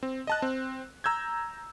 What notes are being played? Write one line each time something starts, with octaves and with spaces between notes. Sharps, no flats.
C4
D#5 A5 F#6
C4
A#5 E6 G6 G#6